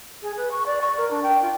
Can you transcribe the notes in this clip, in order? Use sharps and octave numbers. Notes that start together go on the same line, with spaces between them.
G#4
B4
C#6
D5
C#6
A#4
D4
G5
F4